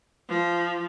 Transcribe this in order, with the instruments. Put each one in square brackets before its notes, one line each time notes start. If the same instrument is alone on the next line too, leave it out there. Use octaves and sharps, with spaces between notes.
[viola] F3